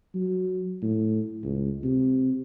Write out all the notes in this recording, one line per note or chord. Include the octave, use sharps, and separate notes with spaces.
F#3
A2
C#2
C3